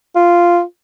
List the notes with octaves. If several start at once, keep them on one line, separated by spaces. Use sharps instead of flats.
F4